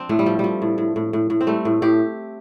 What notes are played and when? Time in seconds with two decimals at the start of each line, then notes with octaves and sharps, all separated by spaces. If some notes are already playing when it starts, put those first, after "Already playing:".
Already playing: F3 C4 D4
0.09 A2 A3
0.19 G3
0.26 F3
0.39 F3 G3
0.62 A2
0.78 A2
0.96 A2
1.13 A2
1.30 A2
1.41 C4
1.47 G3 A3
1.65 A2
1.82 A2 G4